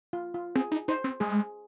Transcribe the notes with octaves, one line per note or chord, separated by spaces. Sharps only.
F4
F4
C4 G#4
D#4
D#4 C5
C4
G#3 G#4